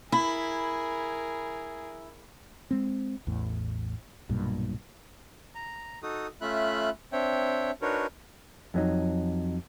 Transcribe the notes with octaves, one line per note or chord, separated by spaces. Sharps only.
E4 G#4 A#4 B5
G#3 C4
A1 E2 A2
B1 G2 A#2
A#5
D#4 F#4 A4 D#6
A3 C#4 F4 E5 B5 F#6
C4 D4 C#5 E5 G5
D4 D#4 F#4 A#4 B4 C#5
F2 F#3 D#4